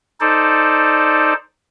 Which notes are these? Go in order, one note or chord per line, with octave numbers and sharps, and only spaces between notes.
D#4 A4 C5 D5